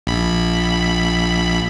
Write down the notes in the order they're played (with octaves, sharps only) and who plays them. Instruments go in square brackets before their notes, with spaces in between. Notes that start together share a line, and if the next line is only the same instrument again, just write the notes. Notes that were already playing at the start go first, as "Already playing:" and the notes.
[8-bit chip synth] A#1 B5